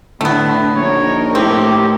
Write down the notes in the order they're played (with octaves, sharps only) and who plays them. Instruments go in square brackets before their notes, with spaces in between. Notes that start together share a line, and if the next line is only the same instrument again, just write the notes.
[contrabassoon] A2 [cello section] D3 [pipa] A3 B3
[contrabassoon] A#1 [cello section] D#4 A#4 [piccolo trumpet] C#5
[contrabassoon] A2 [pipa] C4 [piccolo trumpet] G4